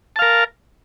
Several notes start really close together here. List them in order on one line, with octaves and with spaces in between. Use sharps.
A5 F5 A#4